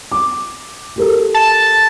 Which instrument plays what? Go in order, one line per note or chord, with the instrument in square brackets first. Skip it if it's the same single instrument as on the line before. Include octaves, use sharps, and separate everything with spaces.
[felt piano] D6
G4 A4 A#4
[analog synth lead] A5